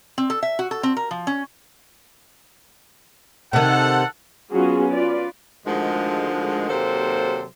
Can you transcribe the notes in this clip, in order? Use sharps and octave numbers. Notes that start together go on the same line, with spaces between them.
C4
A4
E5
F#4
A4
C4
A#4
F3
C#4
C3 D#3 A4 F#5
F#3 B3 C#4 F4 F#4 G#4
F4 B4 D5
D2 D3 D#3 F3 G#3
D#2 C3 F#3 A#3 A4 C5